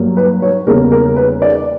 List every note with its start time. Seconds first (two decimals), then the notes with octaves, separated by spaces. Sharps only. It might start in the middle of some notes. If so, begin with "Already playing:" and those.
Already playing: G2 F#3 A#3
0.17 B4
0.42 C#5
0.67 E2 C#3 G3 A#3 A#4
0.92 A#4
1.16 B4
1.42 D5